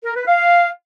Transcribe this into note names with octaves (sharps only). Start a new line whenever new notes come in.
A#4
B4
F5